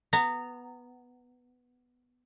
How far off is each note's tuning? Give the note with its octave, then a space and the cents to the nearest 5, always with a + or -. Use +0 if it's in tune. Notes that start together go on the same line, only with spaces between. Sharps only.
B3 +0 A#5 -20